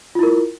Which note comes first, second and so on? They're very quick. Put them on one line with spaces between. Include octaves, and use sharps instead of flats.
F4 E4 A#4